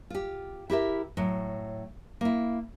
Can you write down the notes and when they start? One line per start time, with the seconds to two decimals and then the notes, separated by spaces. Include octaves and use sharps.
0.10 F4 G4
0.70 E4 G4 A#4 E5
1.17 A2 F#3
2.21 A#3 E4